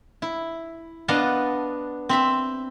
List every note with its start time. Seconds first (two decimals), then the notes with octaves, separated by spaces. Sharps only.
0.22 E4
1.08 B3 D4 D#5 F5 F#5 A5
2.09 C4 E5 B5